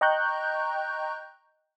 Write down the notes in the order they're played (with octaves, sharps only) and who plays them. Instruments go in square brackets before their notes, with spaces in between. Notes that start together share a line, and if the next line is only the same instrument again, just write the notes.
[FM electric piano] D#5 G5 A#5 C#6 F#6 G6